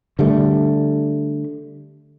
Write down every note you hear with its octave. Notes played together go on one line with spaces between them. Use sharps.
D3 G3 A3